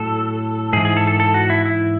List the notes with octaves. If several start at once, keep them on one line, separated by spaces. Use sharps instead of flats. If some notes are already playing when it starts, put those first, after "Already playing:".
Already playing: A2 F#3 A4
G#2 E3 G#4
G#4
A4
A4
A4
F#4
E4
E4